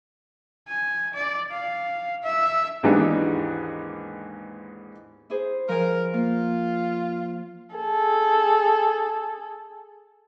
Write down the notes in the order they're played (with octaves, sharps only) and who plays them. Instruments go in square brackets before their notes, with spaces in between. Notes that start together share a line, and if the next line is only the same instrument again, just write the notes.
[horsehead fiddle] G#5
D5
F5
E5
[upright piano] D#2 G#2 E3 B3 D4 D#4
[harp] E4 G#4 C5
[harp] F3 G#5 [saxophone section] A#4
[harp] A#3 [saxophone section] F4
[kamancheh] G#4 A4